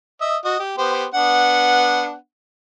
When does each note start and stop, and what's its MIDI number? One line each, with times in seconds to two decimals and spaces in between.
0.21 0.37 75
0.21 0.37 76
0.45 0.58 66
0.45 0.58 75
0.60 0.76 67
0.78 1.05 59
0.78 1.05 67
0.78 1.05 72
1.14 2.14 59
1.14 2.14 62
1.14 2.14 78